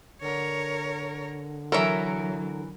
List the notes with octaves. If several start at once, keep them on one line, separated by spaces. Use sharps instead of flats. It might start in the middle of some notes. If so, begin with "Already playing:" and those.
D3 A#4 C#5
E3 F#3 A4 A#4 C#5 E5